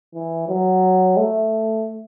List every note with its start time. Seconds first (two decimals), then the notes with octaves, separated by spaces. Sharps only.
0.15 E3
0.49 F#3
1.17 A3